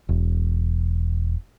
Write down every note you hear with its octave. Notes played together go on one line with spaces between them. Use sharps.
E1